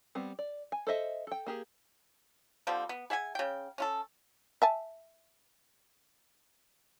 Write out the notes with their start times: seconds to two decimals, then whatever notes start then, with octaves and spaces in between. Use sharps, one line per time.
0.15 G3 B3 C4
0.39 D5
0.72 G#5
0.87 A4 C5 D#5 E5
1.27 A4 G5
1.47 A#3 G4 G#4
2.67 D3 F3 G3 C4
2.89 B3
3.10 G#4 E5 F#5 G#5
3.35 C#3 G5
3.78 C#4 F4 A4
4.62 E5 G#5 A5